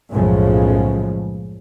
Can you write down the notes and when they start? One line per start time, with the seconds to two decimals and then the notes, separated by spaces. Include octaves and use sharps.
0.11 B1 F#2 A2 C#3 F3 G#3